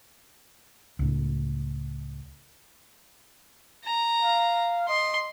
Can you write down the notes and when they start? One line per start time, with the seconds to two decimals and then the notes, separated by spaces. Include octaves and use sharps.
0.99 C#2 A2
3.85 A#5
4.22 F5
4.89 D#5 C6